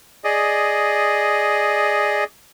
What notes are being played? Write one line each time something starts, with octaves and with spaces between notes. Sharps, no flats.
G#4 D5 D#5